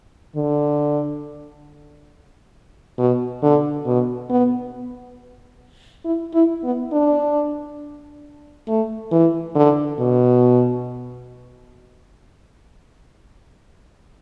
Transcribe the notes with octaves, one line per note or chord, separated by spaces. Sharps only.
D3
B2
D3
B2
B3
E4
E4
B3
D4
A3
E3
D3
B2